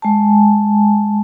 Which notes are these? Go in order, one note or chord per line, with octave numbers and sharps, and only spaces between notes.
G#3 G#5 A5